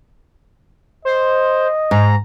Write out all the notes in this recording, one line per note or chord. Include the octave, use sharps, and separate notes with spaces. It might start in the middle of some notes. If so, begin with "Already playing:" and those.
C5 D#5
G#2 A#5